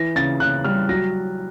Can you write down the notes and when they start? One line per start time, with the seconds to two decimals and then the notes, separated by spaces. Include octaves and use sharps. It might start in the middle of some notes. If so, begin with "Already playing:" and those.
Already playing: E3 A#6
0.16 C#3 A6
0.40 C#3 F#6
0.64 G3 F6
0.89 F#3 A#6